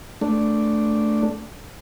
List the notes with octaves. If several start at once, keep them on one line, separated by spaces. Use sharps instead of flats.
A3 D4